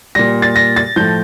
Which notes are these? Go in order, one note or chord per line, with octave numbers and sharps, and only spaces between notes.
A#2 G3 A#6
A6
A#6
A6
A2 F3 G6